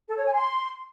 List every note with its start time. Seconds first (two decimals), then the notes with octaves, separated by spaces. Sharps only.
0.09 A4
0.17 C#5
0.25 G#5
0.34 C6